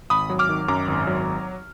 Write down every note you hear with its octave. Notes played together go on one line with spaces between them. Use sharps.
G#1 B5 D#6
F#3
D6 F6
D#3
F#2 A#5 D6
G#1
F#3